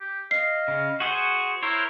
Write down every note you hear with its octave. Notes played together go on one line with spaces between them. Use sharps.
G4
D#5 F5 C7
C#3
F#4 G#4 C5 F#5 C#6
E4 A#4 C5 C#5